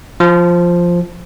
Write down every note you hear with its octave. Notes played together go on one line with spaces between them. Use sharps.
F3